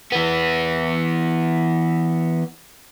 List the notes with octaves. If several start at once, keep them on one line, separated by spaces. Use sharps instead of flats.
E3 B3